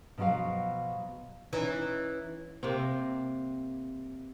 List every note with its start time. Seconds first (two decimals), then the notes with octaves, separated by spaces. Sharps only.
0.18 B2 F3 F#3 F#4 F5
1.53 E3 C#4 D#4
2.63 C3 A#3 C4